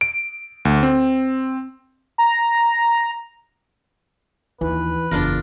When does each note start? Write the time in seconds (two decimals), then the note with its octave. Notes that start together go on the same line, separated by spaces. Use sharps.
0.01 D7
0.65 D2
0.83 C4
2.18 A#5
4.61 D#2 E3 F3 B4
5.11 F#1 E2 D4 F4 A#4